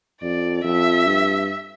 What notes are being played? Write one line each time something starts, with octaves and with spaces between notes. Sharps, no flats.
F2 D5
F2 E5
G2